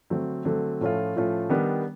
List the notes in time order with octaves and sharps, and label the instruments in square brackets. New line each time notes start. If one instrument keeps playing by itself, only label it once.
[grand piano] D3 F#3 A3 C4
D3 F#3 A3 C4
A2 F3 A3 C#4 F4
A2 F3 A3 C#4 F4
D#3 G3 B3 D4